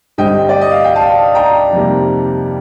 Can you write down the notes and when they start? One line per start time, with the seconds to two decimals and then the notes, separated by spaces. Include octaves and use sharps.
0.18 G2 D3 G3 C4 D#5 G5
0.49 D5
0.61 D#5
0.72 F5
0.84 G5
0.96 F5 A5
1.35 G5 A#5
1.73 F2 C3 D#3 G3 A#3